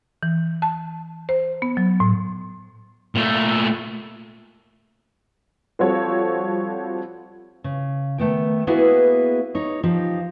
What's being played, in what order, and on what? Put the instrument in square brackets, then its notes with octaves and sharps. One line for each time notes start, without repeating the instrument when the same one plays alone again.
[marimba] E3
A5
C5
B3
F#3
A2
[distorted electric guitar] A#2 A3
[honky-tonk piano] F3 G3 C4 F#4 A4 C#5
[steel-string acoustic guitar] C#3
D#3 A3 B3 G5
A#3 B3 E4 F#4 G#4 B4
D#4 C#5
F3 D#4 G4